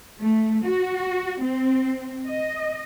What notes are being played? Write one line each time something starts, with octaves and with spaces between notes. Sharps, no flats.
A3
F#4
C4
D#5